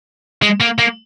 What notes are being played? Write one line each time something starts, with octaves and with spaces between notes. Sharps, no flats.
G#3
A#3
A#3